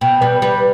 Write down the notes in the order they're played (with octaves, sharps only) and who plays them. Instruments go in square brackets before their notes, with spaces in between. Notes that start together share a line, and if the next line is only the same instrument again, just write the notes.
[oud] B2 [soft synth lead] G5
[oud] G3 [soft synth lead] B4
[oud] G3 [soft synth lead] B4